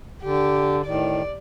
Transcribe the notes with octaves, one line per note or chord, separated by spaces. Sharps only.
D3 G4
A2 D#3 D5